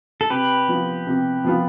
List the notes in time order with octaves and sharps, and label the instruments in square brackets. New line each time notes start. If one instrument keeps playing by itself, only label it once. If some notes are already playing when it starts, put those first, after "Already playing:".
[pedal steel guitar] A4
[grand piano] C3 [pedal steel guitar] G4 B4
[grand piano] F3 B3 F4
C3
F3 B3 F4